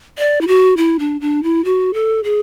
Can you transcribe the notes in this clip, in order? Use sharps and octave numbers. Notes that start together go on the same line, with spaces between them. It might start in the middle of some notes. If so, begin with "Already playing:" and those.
D5
E4
F#4
E4
D4
D4
E4
F#4
A4
G#4